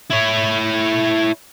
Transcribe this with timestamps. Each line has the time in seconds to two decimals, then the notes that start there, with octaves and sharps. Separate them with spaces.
0.10 E4 C#5